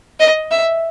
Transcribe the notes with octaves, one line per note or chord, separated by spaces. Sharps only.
D#5
E5